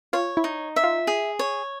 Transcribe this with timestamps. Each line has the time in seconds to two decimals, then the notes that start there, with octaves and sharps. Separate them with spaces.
0.13 F4 C#5
0.37 E4
0.44 D#4
0.76 E5
0.84 F4
1.07 G#4
1.39 C#5